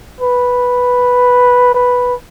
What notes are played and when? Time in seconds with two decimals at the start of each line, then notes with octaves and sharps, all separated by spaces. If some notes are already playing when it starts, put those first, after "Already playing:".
0.21 B4
1.75 B4